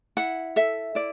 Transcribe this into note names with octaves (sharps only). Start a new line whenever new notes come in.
E4 F#5
A4 E5
E4 D5